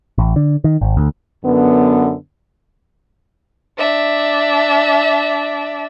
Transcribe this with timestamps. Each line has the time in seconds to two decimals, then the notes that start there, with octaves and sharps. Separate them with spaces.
0.18 A1
0.36 D3
0.64 D#3
0.81 G#1
0.97 D2
1.45 F#2 D3 B3
3.78 D4 E5